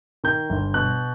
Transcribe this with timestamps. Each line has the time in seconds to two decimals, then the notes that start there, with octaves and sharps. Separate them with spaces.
0.24 D#3 G6
0.50 G1
0.74 B2 F#6